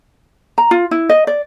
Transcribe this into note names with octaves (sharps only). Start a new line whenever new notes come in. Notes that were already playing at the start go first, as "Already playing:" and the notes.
A#5
F4
E4
D#5
D5